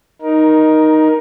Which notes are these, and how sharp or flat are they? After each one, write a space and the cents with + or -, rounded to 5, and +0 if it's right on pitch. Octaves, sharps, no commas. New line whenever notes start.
D#4 +0 A#4 +15